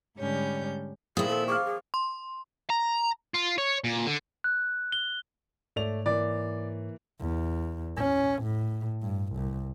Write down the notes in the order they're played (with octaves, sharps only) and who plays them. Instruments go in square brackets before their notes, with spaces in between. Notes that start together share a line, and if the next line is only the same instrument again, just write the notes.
[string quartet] G#2 D3 G3 C#4 G6
[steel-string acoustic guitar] A#2 E4 [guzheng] D#3 F3 C4 [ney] G#4 [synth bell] D#6
[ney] A4
[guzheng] A#3 F4 C#5 [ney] G#4 [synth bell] C#6 D6 F6
[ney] G#4
[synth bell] C6
[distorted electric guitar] A#5
F4
C#5
A#2
D3
[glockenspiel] F#6
G7
[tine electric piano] G#2 C#5 [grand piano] A3 D5 F7
[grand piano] E3 A#3 [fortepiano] D5
[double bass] E2
C#4
A2
G2
C2